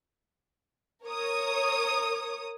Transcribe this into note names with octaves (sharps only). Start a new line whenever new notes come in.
A#4 C#5 D#6